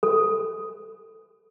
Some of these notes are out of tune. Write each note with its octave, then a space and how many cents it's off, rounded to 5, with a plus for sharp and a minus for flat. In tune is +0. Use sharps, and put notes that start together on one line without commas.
A4 +10